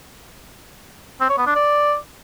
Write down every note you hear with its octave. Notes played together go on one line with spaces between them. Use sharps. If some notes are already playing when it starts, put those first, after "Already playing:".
C4
C#5
B3
D4
D5